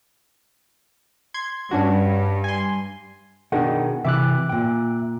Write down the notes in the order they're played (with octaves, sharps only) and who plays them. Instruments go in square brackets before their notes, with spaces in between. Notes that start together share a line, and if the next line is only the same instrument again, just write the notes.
[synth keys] C6 G#6
[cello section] G2 [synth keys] C#4 D4 F#4
[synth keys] G#5 C6
[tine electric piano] B2 D#3 [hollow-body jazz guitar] D4 G#4 F#5
[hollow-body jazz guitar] C3 E3 [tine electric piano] E5 D6 F#6
[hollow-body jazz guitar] A#2 G5